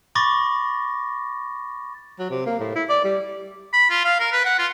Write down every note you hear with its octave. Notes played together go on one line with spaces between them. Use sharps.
B5 C#6 D6 A6 A#6
F#3
C3
A#3
A2
E4
D5
G3
B5
F4
F5
A#4
B4
F#5
F4